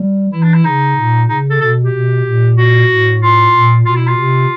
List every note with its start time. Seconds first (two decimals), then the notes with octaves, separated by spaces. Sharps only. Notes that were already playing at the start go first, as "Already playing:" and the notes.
Already playing: G3
0.32 E3 E4
0.43 D4
0.54 E4
0.65 C#3 D#4
0.96 A#2
1.28 C#3 D#4
1.50 A4
1.60 B2 A4
1.83 G4
1.92 B2
2.25 A#2
2.57 F#4
2.89 A2
3.21 F4
3.54 A#2
3.85 B2 F4
3.96 E4
4.07 F4
4.17 C3